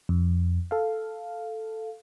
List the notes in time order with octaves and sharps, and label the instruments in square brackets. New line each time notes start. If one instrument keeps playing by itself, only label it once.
[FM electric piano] F2
A4 F5